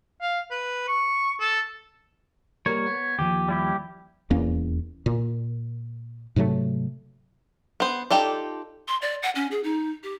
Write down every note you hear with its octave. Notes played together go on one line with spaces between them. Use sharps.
F5
B4
C#6
A4
G3 A#3 A#4 C#5
B3
D#2 F3 G4
G3 E4 G4
D#1 E2 A#3 C#4
A#2
G#2 C3 F#3 A3
B3 C5
D#4 F4 G4 A4 D5
C6
D5
F#5
C#4
G#4
D#4
G4